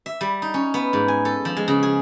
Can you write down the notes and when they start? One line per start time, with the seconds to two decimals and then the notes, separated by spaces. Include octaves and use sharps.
0.06 E5
0.21 G3
0.42 D#4
0.54 C#4
0.74 B3
0.93 G#2
1.08 G#5
1.25 A4
1.45 F3
1.56 G#3
1.68 C#3
1.83 G#4